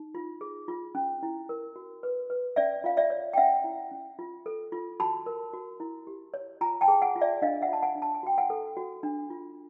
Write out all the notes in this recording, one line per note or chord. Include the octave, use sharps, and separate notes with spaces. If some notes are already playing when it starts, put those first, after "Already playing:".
Already playing: D#4
F4
G#4
F4
C#4
E4
A#4
F#4
B4
B4
C#4 D5 E5
F4 F5
D5 E5
C#5
G5
C#4 E5 F#5
E4
C#4
F4
A4
F4
F#4 A5 B5
A#4
F#4
E4
G4
C#5
F4 G#5 A#5
G5 A5
G#4
F#5 G#5
F4
D5 E5
D4 D#5 F5
E5 F#5
F4 A5
F#5 G#5
D4
A5
G#5
F#4 G5
F#5 G#5
A4
F#4
D4
F4